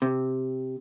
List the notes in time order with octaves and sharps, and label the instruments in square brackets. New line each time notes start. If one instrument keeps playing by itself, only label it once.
[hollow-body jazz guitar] C3